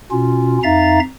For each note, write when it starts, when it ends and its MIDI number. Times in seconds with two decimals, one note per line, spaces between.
0.11 0.58 47
0.11 0.58 61
0.11 0.58 65
0.63 1.00 41
0.63 1.00 63
0.63 1.00 76
0.63 1.00 77
0.63 1.00 82
0.63 1.00 93